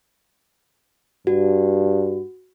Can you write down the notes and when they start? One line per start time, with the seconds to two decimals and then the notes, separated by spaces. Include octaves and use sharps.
1.27 G2 F#4